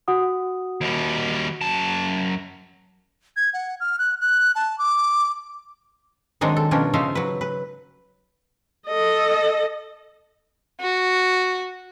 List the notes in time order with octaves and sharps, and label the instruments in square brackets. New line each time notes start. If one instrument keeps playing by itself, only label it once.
[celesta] F#4 F#5 D#6
[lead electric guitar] D#2 G3
F#2 A5
[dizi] G#6
F#5
F6
F#6
F#6
A5
D6
[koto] D#3 F#3 G#3 C4 D4 D#4
A4
B2 F3 G3 C#4 D4 A#4
C#3 F3 D#4 C5 E5 F5
F#3 B4
B4
[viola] A4 D#5
[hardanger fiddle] F#4